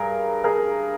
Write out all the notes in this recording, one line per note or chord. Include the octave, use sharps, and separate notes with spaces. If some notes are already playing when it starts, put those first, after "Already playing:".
Already playing: G2 G#4 A#4
G#4 A#4